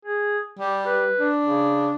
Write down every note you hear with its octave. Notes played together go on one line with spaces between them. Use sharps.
G#4
G3 G4
B4
D4
C#3